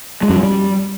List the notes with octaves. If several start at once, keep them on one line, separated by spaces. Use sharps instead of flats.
G#3
F#2
F#3
G3